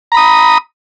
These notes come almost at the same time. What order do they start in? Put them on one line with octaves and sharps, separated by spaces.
A#5 B5 D#6